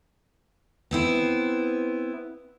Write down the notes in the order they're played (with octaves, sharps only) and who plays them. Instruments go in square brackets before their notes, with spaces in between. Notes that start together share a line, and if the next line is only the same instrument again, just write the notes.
[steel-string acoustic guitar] B3 C4 E4